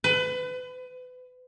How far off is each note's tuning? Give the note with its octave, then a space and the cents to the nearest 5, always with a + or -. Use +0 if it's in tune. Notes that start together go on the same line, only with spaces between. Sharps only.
B4 +30